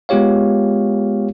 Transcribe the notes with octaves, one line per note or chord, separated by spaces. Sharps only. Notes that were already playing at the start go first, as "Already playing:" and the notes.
G#3 B3 F4 G4 C#5 F5